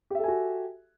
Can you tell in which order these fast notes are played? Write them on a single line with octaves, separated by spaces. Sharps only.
G4 E5 A4 G#5 F#4